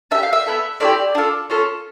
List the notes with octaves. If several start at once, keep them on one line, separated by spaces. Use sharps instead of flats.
D4 G4 E5
F5
E5
B3 E4 A4
A3 C4 E4 G4 D5
D4 F4 A4
C#4 F4 A4